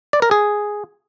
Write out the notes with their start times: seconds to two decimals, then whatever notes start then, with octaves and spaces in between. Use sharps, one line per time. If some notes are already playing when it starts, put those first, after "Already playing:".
0.13 D5
0.22 A#4
0.31 G#4